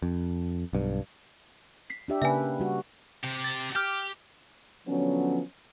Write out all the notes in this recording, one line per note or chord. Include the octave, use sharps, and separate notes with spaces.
F2
B1 G2
B6 C7
D4 G4 E5
C#3 A#3 B4 E5 G#5
G3 F#4
C3 G4
A6
G4 D6 F6 G6
D3 F3 F#3 B3 C#4